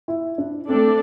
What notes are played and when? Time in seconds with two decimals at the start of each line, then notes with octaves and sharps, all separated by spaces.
0.08 E4
0.38 D4
0.69 A3 C4 D4 A4 D5